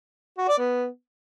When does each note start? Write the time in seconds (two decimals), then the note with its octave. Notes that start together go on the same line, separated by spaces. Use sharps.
0.38 F#4
0.48 D5
0.58 B3